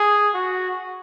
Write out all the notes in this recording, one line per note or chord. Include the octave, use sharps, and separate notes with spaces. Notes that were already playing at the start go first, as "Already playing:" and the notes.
Already playing: G#4
F#4